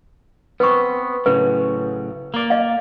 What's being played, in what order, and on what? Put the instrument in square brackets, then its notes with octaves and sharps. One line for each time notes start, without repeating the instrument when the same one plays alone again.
[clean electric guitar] B3 C4 [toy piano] B4 C#6
[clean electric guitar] A2 C#3 F#3 [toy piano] B4
[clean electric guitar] A#3 D5
[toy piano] D#5 F5